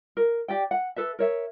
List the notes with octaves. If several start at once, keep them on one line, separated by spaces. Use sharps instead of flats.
A#4
G4 D5 G5
F#5
A4 B4 E5
A#4 C#5 E5